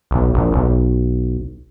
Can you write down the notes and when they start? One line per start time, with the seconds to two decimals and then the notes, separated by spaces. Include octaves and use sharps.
0.11 B1
0.34 A#1
0.52 B1